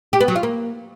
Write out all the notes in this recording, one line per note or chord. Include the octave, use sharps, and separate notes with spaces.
G4
B3
F#3
F4
A#3